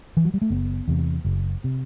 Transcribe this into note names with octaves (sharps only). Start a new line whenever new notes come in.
E3
F#3
G3
A3
F#1 B3
E2 C3
F#1
C3